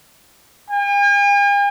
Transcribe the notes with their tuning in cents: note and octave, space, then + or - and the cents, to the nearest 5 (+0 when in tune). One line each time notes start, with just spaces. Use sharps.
G#5 -45